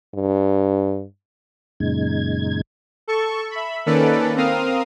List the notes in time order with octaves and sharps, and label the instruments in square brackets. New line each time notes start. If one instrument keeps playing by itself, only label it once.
[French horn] G2
[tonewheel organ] F#2 A#2 C#3 G#3 D#4 G#6
[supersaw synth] A4 C#6
E5 B5
D#3 A#3 C#4 A4 B4 D5
C4 A#4 F5 D#6 F6